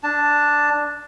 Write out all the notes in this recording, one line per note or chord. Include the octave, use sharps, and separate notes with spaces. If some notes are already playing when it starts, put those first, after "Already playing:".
D4 A5